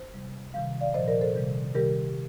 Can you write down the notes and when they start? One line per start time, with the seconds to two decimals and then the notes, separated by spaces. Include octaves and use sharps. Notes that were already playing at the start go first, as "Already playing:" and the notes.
Already playing: C5
0.14 C3 G3
0.54 C3 D#3 G3 F5
0.81 D5 F5
0.94 A#2 F3 C5 D#5
1.08 A#4 D5
1.21 A4 C5
1.35 C3 D#3 G3
1.75 C3 D#3 G3 G4 A#4